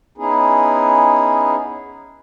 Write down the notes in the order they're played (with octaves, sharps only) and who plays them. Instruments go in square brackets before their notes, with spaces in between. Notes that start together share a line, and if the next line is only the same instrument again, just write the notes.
[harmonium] B3 C#4 D#4 E4 G#4